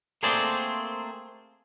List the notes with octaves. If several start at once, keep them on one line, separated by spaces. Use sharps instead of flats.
A3 A#3 C4 G#4 C5 D5